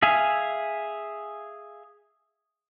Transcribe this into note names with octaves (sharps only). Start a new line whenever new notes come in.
G#4 E5 F5 G#5